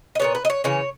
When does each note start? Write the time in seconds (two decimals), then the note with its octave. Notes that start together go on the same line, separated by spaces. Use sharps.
0.15 D#5
0.19 A#2 F#3 B3 C#5
0.35 B4
0.45 D#5
0.50 C#5
0.64 C#3 E3 C#5